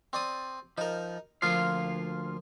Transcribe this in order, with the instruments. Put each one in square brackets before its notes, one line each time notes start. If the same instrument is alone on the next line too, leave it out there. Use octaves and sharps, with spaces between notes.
[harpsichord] C4 D5 D#6
[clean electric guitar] F3 [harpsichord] D#4 A#4
[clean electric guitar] D2 F4 F5 [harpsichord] F3 A#3